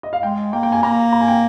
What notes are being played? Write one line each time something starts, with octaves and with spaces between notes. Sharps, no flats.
D#5
F5
G#3 G5
A#3 G5
G5
G#5
A#3 A#5
A#5
G#5
G5